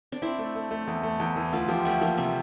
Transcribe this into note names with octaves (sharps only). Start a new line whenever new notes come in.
D4
C4 E4
A3
A3
A3
E2
A3
E2
E3
D2 F4
F3 G4
D2 A3
F3 A#3
C3 A3